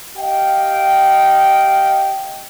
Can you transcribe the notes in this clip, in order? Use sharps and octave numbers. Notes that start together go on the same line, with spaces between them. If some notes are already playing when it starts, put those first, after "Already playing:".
G4 D#5 F5 G5